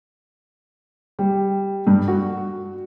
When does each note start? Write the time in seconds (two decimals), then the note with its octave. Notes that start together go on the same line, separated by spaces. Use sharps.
1.19 G3
1.87 G2
2.08 F#4